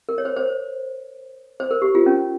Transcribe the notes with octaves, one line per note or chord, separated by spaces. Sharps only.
A#4
C#5
C5
C5
C5
A#4
G4
F4
C#4